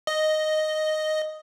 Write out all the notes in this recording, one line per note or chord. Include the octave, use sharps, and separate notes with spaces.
D#5